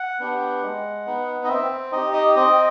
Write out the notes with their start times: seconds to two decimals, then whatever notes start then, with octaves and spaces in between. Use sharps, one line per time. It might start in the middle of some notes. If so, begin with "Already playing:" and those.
Already playing: F#5
0.20 B3 D4 G4
0.63 G#3
1.06 B3 D#4
1.44 D#5
1.48 C4 E5
1.92 D#4 G4 D#5
2.13 D#5
2.36 C4 D#5